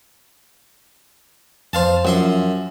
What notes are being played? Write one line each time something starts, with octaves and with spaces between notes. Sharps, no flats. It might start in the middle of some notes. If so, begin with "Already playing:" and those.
F2 C5 F5 A5
F#2 F3 E5 C6